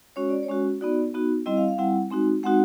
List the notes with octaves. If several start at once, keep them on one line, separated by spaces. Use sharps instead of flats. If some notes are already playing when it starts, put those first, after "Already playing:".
G#3 C#4 F#4 C#5
D5
C#5
G#3 C#4 F#4
B3 D#4 F#4 D5
B3 D#4 F#4
G3 C4 E4 D#5
F5
F5
G3 C4 E4 F#5
G#3 C4 D#4 F#4
G#3 C4 D#4 F#4 F#5